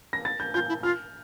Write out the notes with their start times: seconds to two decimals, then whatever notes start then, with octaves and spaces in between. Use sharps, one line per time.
0.13 A#6
0.25 A6
0.40 G6
0.54 F4 G6
0.69 E4
0.83 F4 F6